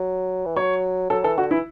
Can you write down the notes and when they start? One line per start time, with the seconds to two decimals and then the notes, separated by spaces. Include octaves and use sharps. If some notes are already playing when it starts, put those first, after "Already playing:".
Already playing: F#3
0.46 E3
0.56 F#3 C#5
1.10 F#3 A4
1.24 E3 A4
1.38 D3 F#4
1.51 E3 E4